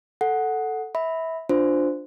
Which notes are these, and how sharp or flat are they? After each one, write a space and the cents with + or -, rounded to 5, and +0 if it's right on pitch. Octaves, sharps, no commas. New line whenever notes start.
A4 +0 F#5 +0
E5 -25 B5 +0
D4 +0 F4 +15 C5 -15